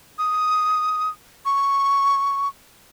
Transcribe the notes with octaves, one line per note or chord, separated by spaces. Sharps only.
D#6
C#6